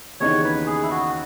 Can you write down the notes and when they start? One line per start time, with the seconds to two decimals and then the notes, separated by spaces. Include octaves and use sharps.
0.20 D#2 C#3 E3 B3 D#4 C#5
0.44 B4
0.67 G#4
0.83 E4
0.91 F#4